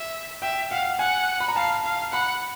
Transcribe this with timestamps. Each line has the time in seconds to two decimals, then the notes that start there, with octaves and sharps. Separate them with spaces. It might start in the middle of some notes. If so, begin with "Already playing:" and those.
Already playing: E5
0.42 E5 G5
0.70 F5 F#5
0.99 F#5 G#5
1.40 B5
1.48 A#5
1.56 F5 A5
1.84 F5
2.12 F#5 B5